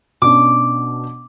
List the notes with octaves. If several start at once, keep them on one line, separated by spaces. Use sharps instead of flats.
B2 C#4 D4 D6